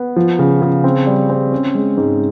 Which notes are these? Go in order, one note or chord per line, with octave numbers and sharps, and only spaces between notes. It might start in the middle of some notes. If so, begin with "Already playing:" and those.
Already playing: B3
F3
C#3
C#3
C4
G3
C4
C#4
G#3
G#2